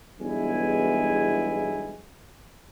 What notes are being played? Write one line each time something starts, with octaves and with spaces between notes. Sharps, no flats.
B1 E2 G2 G#3 E4 G#5